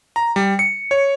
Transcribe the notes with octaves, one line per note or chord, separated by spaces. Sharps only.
A#5
G3
C#7
C#5